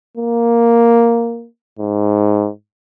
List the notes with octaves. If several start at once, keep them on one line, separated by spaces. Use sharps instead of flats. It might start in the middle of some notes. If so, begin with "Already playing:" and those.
A#3
G#2